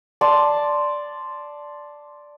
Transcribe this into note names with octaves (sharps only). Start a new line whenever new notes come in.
D5 A5 C6